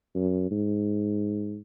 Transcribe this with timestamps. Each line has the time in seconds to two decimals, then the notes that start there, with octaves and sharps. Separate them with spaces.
0.15 F#2
0.51 G#2